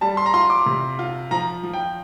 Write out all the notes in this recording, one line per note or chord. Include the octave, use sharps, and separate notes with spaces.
G3 A5
C6
A#5
F4 C6
D6
C3
F4
F3 A#5
F3
G5